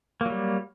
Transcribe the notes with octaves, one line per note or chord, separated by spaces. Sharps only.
F#3 G3 A#3